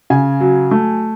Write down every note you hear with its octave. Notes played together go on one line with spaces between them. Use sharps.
C#3 G#5
F#3
A3